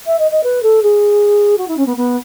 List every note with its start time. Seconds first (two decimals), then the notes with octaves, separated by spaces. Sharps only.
0.06 E5
0.19 D#5
0.31 D#5
0.43 B4
0.62 A4
0.82 G#4
1.57 F#4
1.68 E4
1.77 C#4
1.86 B3
1.97 B3